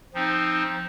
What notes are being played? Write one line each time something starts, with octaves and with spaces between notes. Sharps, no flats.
F3 C4 D#4